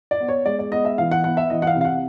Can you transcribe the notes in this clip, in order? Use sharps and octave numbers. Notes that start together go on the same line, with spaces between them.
D5
B3
C#5
G#3 D5
D5
B3 D#5
E5
E3 F5
F#5
B3 F#5
E5
E3 D#5
F#5
F5
C3
F5
F#5